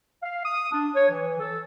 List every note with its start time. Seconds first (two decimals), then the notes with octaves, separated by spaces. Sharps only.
0.23 F5
0.45 D#6
0.72 D4
0.95 C#5
1.09 E3
1.39 A4